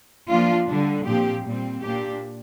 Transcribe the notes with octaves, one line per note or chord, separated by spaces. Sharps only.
F3 A#3 D4 F4
D3 G3 D4
A#2 F3 C4 G4
A#2 G3 C4
A#2 A#3 D4 G4